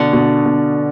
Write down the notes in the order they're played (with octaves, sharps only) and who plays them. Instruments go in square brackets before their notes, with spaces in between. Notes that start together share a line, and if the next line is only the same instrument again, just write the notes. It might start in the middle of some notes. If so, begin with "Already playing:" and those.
Already playing: [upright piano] B2 [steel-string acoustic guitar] D3
[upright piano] B2
B2